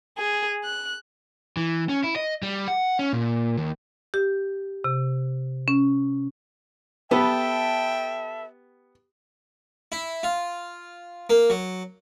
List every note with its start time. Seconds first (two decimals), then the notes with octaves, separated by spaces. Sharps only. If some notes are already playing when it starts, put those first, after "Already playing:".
0.18 G#4
0.64 F#6
1.57 E3
1.89 C#4
2.04 E4
2.16 D#5
2.43 G3
2.68 F#5
2.99 C#4
3.13 A#2
3.58 D#2
4.14 G4
4.84 C3
5.68 C#4
7.11 B3 G4 A4 B4 E5 G5
9.92 E4
10.23 F4
11.30 A#3
11.50 F#3